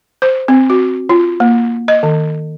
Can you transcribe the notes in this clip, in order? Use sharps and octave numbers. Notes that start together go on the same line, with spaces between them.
C5
C4
F#4
F4
A#3
D#5
D#3